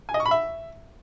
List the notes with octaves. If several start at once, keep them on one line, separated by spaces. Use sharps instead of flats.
G#5
D#5
C#6
B5
E5